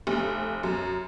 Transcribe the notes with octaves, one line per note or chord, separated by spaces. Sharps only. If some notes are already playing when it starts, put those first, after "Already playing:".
F1
F#2